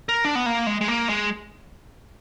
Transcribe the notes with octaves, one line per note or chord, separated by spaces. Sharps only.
A#4
D4
B3
A#3
G#3
G#3
A#3
G#3